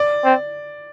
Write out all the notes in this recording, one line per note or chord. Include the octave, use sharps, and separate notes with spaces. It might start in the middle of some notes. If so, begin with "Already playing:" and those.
Already playing: D5
C4